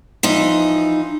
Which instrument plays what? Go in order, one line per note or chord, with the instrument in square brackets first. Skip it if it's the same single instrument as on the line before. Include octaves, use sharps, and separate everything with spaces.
[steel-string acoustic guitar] E3 F3 D#4